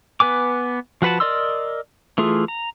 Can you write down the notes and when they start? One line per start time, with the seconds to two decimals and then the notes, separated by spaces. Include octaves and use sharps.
0.20 B3 B4 G#5 D6
1.02 F3 F#4 B4 F#5 A5
1.20 A#4 D5 D#5 C6 E6
2.18 E3 A3 F4 G#4
2.48 A#5